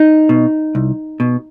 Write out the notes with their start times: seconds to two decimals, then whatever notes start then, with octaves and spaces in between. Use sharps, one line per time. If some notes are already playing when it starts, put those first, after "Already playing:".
Already playing: D#4
0.29 B2
0.75 C2
1.20 B2